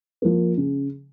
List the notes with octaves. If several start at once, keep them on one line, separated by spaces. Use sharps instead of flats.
F3 A#3
C#3